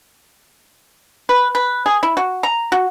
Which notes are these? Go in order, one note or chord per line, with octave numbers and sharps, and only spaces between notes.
B4
B4
G#4
E4
F#4
A#5
F#4